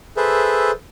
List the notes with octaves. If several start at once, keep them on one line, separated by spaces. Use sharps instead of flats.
G#4 A4 B4 C5 E5